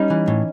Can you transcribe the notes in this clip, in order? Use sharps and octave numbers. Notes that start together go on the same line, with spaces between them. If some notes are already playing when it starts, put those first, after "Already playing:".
Already playing: G3 C#4 D#4
E3
A2